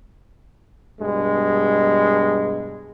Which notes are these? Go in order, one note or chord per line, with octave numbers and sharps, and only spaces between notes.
G2 B2 G#3